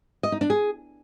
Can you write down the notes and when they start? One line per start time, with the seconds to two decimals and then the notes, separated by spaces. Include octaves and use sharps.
0.23 D#5
0.32 D#4
0.41 D4
0.50 G#4